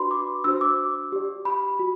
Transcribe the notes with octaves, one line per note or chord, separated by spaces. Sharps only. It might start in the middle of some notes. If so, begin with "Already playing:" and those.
Already playing: D4 F#4 B4 D5 B5 C6
D6
D4 F#4 C5 E6
D6
G4 D5
B5
F#4